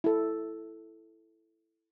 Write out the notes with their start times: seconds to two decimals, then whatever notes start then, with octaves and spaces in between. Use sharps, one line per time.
0.04 E4 A4